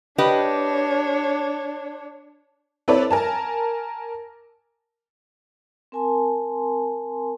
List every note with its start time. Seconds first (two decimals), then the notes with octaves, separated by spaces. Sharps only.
0.18 D4 G4 B4 C#5 D#5
2.88 C4 E4 A4 B4 C#5 D5
3.11 A#4 G#5 A5
5.92 C4 A#4 G#5 A5 C6